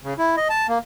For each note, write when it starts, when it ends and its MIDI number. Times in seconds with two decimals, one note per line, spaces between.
0.04 0.14 49
0.18 0.35 64
0.37 0.48 75
0.50 0.67 81
0.68 0.78 58